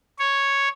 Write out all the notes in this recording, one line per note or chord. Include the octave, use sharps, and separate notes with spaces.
C#5